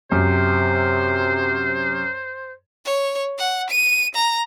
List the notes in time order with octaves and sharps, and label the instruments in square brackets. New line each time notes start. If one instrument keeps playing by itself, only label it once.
[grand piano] F#2 [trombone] C3 [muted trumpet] C5
[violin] C#5
F#5
D#7
A#5